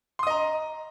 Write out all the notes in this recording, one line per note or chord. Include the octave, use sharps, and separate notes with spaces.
D#5 A#5 C6 D#6